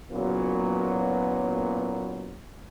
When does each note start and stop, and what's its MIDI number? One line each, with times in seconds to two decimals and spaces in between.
0.11 2.39 30
0.11 2.39 46
0.11 2.39 54
0.11 2.39 59